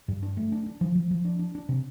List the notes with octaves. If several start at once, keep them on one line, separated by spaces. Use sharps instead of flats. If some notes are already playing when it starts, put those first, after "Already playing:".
G2
D4
A3
D4
D4
F3
F3
F3
D4
D4
D4
C3